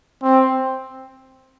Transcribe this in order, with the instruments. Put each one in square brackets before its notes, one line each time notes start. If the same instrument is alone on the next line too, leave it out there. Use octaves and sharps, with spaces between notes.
[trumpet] C4